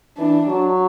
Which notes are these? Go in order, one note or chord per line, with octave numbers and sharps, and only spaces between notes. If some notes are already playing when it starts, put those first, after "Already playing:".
E3 D4
F#3